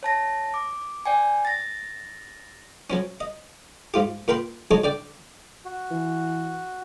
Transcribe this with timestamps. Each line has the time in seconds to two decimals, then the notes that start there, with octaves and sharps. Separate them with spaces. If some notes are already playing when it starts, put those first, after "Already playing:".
0.03 C#5 A5 A#6
0.54 D6
1.06 D5 G5 G#5
1.45 A6 A#6
2.90 F#3 C4 C#4
3.20 D#5
3.94 G#2 F4 G4
4.28 A#2 A#4 B4 G5 C6
4.71 F#3 G#3 C4 D#4 A4 C#5
4.84 D3 D5 G5
5.65 F#4
5.91 E3